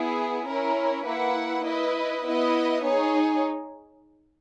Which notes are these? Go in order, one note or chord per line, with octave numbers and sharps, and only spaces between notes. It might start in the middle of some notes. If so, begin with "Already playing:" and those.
Already playing: B3 E4 G#4
C#4 E4 A#4
A#3 E4 B4 F#5
E4 B4 D#5
B3 E4 B4 D#5
D#4 G#4 C#5